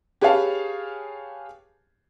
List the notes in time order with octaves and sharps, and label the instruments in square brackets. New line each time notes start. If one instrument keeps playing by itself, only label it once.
[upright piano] G4 G#4 B4 C#5 F5 A5